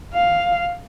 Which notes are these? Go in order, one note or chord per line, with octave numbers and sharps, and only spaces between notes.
F5